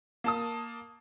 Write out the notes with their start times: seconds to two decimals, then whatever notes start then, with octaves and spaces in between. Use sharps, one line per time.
0.24 A#3 A5 D#6